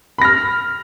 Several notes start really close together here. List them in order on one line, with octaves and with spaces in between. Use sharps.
B5 A#6 F6